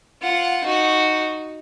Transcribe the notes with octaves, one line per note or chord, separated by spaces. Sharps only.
F4 F#5
D#4 F#4